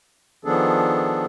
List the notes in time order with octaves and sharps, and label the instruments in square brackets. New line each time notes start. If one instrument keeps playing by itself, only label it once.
[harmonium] D#3 F3 B3 D4 G#4 A4